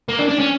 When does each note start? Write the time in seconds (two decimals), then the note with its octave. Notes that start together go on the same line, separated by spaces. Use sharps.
0.09 A#3
0.19 D4
0.29 D4
0.39 C#4